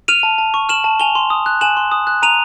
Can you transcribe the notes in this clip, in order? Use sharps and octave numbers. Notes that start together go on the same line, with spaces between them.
F6 D#7 F7
A5
A5
C#6
F6 E7 F#7
A5
G#5 F7 G7
C6
D#6
F#6
G#5 E7 F#7
C6
D#6
F#6
A#5 D#7 F7